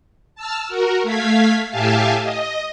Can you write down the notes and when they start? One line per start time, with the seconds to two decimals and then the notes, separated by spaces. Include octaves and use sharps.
0.35 A5 E6 F6
0.68 F#4 A#4
1.03 A3 F5 G#6 B6
1.70 A2 G4 E5 F5 G#5 A5
2.22 D#5